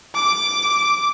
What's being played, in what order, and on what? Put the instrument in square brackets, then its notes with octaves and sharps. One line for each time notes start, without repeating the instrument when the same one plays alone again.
[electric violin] D6